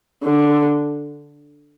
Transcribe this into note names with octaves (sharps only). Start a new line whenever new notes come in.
D3